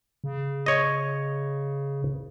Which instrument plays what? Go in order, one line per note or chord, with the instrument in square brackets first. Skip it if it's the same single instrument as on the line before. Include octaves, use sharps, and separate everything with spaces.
[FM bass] C#3
[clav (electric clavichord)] C#5 D#5